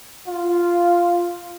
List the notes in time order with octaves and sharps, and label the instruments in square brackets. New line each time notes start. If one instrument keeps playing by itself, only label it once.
[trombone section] F4